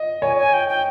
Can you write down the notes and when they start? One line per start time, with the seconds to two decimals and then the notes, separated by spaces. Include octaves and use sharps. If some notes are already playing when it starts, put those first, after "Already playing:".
Already playing: D#5
0.22 C#5 G#5
0.37 G#5
0.53 G5
0.68 G5